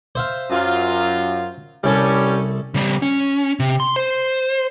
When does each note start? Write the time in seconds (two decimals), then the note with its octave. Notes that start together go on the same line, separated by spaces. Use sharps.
0.15 C5 E5 F5
0.50 F#2 F4
1.84 C2 G3 C#4 A4
2.74 C#3 G3
3.02 C#4
3.60 C3
3.80 C6
3.96 C5